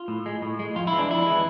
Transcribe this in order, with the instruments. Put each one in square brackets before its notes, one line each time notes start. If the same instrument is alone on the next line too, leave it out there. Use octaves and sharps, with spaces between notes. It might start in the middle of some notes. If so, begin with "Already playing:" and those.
Already playing: [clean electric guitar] F4
A2
G#3
A2
G#3
F2 F4
E4
E3 G#3
D4
F2 E4
E3 G#3